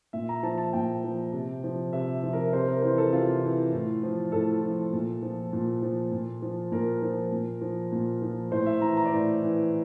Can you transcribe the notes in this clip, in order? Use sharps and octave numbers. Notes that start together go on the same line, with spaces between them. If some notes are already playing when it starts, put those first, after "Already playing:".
A#2 E5
A#5
F3 A5
A5
A#2 G5
F3
C3
F3
C3 E5
F3
A#4
C3 C5
A#4
E3 C5
A4
C3 F4
E3
A2
F3
A2 A4
F3
A#2
F3
A#2
F3
A#2
F3
A#2 A#4
F3
A#2
F3
A#2
F3
A2 C5
E5
E3 A#5
A#5
D5
A2 C5
E3